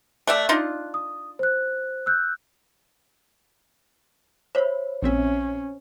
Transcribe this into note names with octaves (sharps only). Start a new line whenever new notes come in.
A3 D5 E5 F#6
D4 D#4 F4
D#6
C5 F#6
E6 F#6 G6
C5 C#5 E5 B5
A#1 C4 C#4 E5